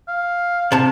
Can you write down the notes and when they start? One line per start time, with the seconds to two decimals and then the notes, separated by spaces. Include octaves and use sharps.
0.08 F5
0.72 C3 A5